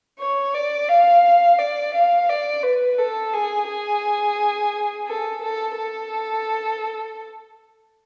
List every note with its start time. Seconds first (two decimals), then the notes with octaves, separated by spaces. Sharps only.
0.19 C#5
0.54 D5
0.89 F5
1.58 D5
1.94 F5
2.29 D5
2.63 B4
2.99 A4
3.34 G#4
3.68 G#4
5.08 A4
5.43 A4
5.78 A4